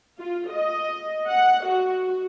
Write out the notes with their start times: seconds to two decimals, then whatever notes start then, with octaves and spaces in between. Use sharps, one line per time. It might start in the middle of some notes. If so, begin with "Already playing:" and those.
0.19 F4
0.50 D#5
1.28 F#5
1.67 F#4